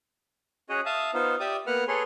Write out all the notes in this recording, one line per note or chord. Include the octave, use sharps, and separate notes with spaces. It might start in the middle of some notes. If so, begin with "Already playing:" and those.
C#4 F#4 G#4 C#5 D#5
E5 F5 A5 D#6
B3 D#4 F4 C5
G4 D5 E5 G5 D6 D#6
A#3 B3 B4 F#5 F6
G#4 A4 B4 C#5 C6